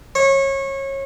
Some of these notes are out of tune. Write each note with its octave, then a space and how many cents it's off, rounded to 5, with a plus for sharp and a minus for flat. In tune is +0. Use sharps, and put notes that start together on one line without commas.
C#5 -25